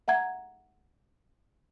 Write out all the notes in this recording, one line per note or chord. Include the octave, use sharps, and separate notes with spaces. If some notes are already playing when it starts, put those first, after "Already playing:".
E5 F#5 A#5 G#6